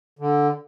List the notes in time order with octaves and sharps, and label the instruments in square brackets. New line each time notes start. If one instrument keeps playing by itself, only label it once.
[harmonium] D3